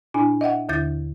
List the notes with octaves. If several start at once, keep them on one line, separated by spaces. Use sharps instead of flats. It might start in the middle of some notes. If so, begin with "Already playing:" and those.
A#2 D4 E4 G#5
D#5 E5 F#5 G5
D#2 D3 E4 G6 A6